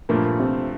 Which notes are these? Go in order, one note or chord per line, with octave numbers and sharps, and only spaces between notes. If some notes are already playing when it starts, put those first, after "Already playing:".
G2 A#2 F3 A3 A#3
C3 C4